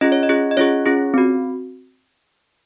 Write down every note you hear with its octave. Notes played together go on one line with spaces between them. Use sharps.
C#4 F4 G#4 D#5
C#5
D#5
C#4 F4 G#4
D#5
C#4 F4 G#4 C#5
C#4 F4 G#4
C4 F#4